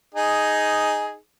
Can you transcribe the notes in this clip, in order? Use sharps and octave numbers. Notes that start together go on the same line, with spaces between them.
D#4 G#4